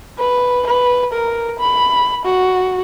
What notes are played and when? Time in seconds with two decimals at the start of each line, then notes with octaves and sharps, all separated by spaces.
0.19 B4
0.67 B4
1.13 A#4
1.59 B5
2.25 F#4